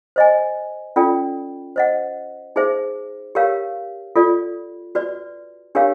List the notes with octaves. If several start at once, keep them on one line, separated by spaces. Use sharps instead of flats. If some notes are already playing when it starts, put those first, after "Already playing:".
C5 D#5 G#5
C#4 F4 A4 D5 G5
C5 D#5 F#5
D#4 G#4 C5 E5
G4 A#4 C#5 F5
F4 A4 D5
F#4 B4 D5
D4 G4 A#4 C#5 F5